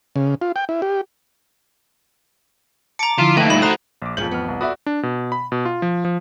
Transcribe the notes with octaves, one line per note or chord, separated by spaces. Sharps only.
C#3
F4
G5
E4
G4
A5 A#5 D6 C#7
D3 F3 E4 F4
E3 A3 A#3 D#4 G5
G2 A#2 B5 E7
F#4 C5 A#5 D#6 F#6
A#1 D6
F2 A#2 C#3 G6 F#7
A1 B3 F6
C2
F#4 A4 D5 E5 B5 D#6
D4
B2
B5
B2
F4
F3
F3